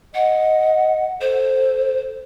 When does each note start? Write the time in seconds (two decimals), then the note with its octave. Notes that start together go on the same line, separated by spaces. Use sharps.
0.14 D#5 F#5
1.21 A4 C5